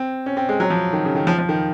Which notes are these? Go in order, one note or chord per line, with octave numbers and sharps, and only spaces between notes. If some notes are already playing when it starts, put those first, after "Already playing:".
Already playing: C4
C#4
C4
G#3
F#3
F3
D#3
C#3
D#3
F3
F3
D#3